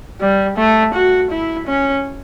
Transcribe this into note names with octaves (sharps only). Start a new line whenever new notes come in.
G3
A3
F#4
E4
C#4